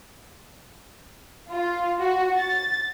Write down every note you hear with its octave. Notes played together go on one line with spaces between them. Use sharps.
F4
F#4
A6